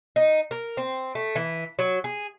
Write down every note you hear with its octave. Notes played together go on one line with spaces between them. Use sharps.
D#4
A#4
C4
A3
E3
F#3
G#4